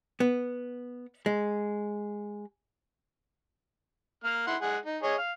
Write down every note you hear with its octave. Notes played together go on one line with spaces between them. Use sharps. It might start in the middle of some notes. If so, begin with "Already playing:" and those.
B3
G#3
A#3 F6
E4 F#5 C6
G#3 G#4 F#5
D#4
G#4 C#5 D#5
F5